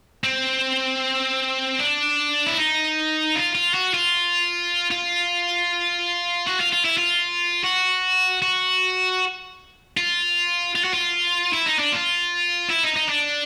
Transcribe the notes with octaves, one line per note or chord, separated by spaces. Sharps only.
C4
D4
E4
D#4
F4
F4
F#4
F4
F4
F#4
F4
F4
E4
F4
F#4
F#4
F4
F4
F#4
F4
E4
D#4
D4
F4
E4
D#4
D#4
D4